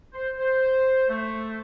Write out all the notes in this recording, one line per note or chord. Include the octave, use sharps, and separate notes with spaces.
C5
C5
A3